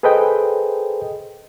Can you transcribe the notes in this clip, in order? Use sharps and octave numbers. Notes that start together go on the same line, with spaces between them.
G#4 A4 B4 C5 D#5 G5